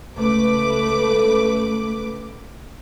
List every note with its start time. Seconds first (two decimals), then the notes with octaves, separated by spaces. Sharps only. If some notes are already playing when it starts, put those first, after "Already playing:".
0.16 C#2 A3 B4 D6